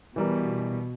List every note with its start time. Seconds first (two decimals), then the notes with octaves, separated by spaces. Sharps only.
0.16 B2 E3 G3 A#4